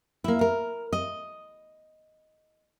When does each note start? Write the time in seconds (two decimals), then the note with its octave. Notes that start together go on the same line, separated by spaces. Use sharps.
0.24 A#3 E4
0.41 A#4
0.93 D#5